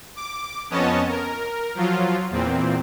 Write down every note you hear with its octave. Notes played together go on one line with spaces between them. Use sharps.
D6
F2 B3 C#4 C#5 D#5 A5
A#4
F3 F#3 F4
E2 A#2 C4